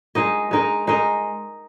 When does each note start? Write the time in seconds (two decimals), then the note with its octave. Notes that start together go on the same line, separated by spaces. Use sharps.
0.15 G#3 D#4 A#4 D#5
0.51 G#3 D#4 A#4 D#5
0.87 G#3 D#4 A#4 D#5